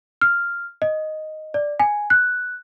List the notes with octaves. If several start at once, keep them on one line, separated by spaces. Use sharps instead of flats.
F6
D#5
D5
G#5
F#6